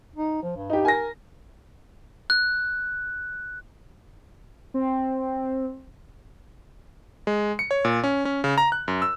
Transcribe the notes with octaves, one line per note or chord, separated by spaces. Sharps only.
D#4
F3
G2
D#4 G4
A#4 G#5 A#6
F#6
C4
G#3
C#7
C#5
A#2
C#4
C#4
C#3
A#5
F#6
F#2
E6